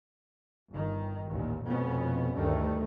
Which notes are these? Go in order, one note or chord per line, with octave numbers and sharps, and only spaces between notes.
G1 D#3
A1 D#2 A#2
F1 F2 B2 B3 C#4
D2 G2 D#3 A3